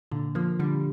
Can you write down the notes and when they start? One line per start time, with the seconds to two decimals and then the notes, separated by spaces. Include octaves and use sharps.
0.11 A#2 D3
0.35 F3 A#3
0.59 D3 G3